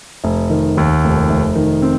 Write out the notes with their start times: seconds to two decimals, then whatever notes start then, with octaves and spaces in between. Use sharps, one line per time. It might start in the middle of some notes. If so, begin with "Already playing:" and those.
0.24 F1
0.50 D#3
0.77 D#2
1.04 F1
1.30 F1
1.56 D#3
1.82 C4